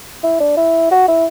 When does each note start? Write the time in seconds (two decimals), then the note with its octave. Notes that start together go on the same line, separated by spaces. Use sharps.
0.24 E4
0.40 D4
0.57 E4
0.91 F#4
1.08 E4